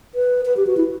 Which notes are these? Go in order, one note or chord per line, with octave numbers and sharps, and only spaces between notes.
B4
B4
G4
F#4
E4